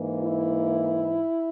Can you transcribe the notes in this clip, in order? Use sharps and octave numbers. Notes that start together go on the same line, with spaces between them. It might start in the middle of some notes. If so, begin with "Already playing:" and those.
Already playing: G#2 E3 A#3
E4